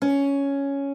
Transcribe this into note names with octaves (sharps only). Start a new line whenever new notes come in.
C#4